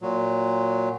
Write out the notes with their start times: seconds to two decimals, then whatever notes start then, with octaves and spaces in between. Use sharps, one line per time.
0.01 A#2 F#3